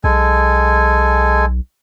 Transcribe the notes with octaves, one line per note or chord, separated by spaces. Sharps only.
B1 G#3 A4 G#5